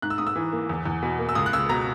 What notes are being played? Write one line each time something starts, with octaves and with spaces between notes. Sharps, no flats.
G#2 F#6
E6
G#2 D#6
E6
E3
A#3
E2
E2
B2
A#3
E6
C#2 D#6
F#6
C#2 E6
B2 A#5